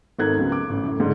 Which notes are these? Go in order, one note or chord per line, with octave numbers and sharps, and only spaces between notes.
G#1 D#4 A4 A#4 F#6 G#6
C#2 F#3 B3
D6
A1
F#2 A2
G#2 D3